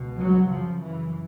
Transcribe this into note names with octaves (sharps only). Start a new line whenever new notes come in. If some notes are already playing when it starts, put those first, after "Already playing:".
Already playing: C#2 B2
F#3
F#2 C#3 F3
E3